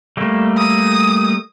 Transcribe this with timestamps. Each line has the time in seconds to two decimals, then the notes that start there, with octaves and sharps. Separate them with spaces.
0.17 G3 A3 A#3
0.57 D#6